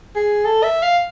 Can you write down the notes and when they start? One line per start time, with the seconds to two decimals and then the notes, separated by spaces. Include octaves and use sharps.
0.16 G#4
0.45 A4
0.64 E5
0.83 F5